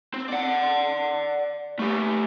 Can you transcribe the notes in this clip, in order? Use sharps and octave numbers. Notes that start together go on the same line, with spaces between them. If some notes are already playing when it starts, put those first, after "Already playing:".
C4
D5 F#5
A3 G4